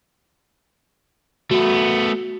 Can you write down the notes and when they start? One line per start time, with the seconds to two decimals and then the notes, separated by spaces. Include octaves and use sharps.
1.51 A3 B3 F#4